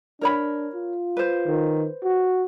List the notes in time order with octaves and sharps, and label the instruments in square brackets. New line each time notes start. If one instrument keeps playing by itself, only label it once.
[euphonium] D4 [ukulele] A#4 C#5 B5
[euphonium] F4
[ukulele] B4 C5
[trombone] D#3
F#4